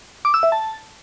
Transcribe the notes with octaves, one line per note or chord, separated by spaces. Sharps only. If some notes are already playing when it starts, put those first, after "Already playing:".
D6
E6
E5
A5